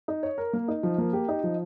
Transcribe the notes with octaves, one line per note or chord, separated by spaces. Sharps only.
D#4
C#5
A#4
A#3
D#4
F3
A#3
G4
D#4
F3